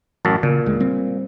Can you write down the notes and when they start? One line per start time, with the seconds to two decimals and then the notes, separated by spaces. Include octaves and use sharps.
0.25 A1 F#2 A5
0.43 A#2 C#3
0.66 D2 G#3
0.80 G3 C4